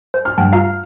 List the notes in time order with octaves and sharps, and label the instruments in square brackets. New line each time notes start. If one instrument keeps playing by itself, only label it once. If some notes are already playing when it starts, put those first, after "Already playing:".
[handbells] C5
[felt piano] F6
[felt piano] G2 [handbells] F#5 G5 A5
[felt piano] F4 [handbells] F5 A#5 F6